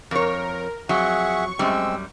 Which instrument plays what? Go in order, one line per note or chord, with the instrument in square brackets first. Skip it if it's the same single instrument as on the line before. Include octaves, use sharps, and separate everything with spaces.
[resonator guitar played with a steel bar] F2 C#5 [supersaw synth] A#4
[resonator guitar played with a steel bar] F2 F#3 [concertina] G#4 E5 F#5 [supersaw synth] C#6
[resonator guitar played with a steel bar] F#2 G3 [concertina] G#3 C4 E6